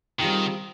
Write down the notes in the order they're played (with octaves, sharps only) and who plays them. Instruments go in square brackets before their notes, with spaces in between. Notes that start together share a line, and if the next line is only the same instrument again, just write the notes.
[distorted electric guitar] D#3 [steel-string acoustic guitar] G3 C4 F4 G#4